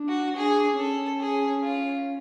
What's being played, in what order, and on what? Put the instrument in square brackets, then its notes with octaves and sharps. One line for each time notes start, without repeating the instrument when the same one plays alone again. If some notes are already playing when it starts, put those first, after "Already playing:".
Already playing: [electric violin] D4
[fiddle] F#4
[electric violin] D4 [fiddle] G#4
[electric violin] C#4 [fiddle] A4
[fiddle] G#4
F4